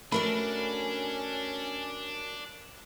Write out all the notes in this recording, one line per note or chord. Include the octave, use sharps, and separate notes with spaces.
A3 C#4 D4 F#4 A#4 D5 B5